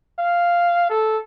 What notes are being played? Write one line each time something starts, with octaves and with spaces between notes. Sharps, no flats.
F5
A4